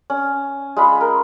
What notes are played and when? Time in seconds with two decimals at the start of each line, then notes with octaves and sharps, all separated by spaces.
0.10 C#4
0.76 G#3 F4 B5
1.01 A#4